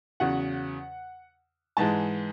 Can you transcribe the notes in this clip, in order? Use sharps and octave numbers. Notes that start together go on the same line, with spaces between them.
E2 C#3 F#3 F#5
G#2 E3 G#3 A5